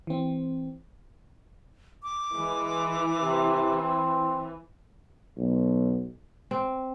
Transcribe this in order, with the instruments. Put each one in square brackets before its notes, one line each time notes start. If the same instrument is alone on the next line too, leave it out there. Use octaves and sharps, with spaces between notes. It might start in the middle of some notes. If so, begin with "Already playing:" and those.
[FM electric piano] E3 C4
[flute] D6
[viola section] E3 [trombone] G#3
[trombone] C3
C4
[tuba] B1
[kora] C4